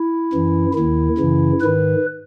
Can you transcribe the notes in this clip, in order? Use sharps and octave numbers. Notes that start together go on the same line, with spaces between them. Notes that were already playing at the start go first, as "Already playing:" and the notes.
Already playing: E4
F#2 E3
D#2 D#3 E4
F#2 C#3 E3
G#2 D#3 B4